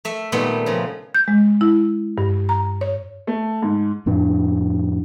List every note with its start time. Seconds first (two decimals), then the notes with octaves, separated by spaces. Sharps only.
0.05 A3 E5
0.32 A#2 D#3 G3 A3 B3
0.66 C#3 F3
1.15 G6
1.28 G#3
1.61 E4
2.18 G2
2.49 A#5
2.81 C#5
3.27 A3
3.62 G#2
4.06 F2 A2 D4